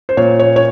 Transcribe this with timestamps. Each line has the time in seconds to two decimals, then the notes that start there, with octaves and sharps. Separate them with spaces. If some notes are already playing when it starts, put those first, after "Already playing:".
0.09 C5
0.17 A#2 C#5
0.39 C#5
0.56 C#5